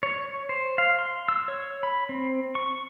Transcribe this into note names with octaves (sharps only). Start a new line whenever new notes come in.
C#5
C5
F5
C6
E6
C#5
B5
C4
C#6